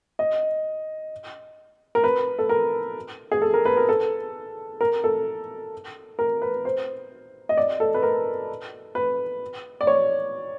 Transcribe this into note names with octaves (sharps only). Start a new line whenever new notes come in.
D#5
A#4
B4
A4
A#4
G#4
A4
A#4
B4
A#4
A4
A#4
A4
A#4
B4
C5
D#5
D5
A4
B4
A#4
B4
D5
C#5